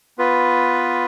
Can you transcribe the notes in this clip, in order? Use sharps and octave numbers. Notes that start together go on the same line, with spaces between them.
B3 F4 B4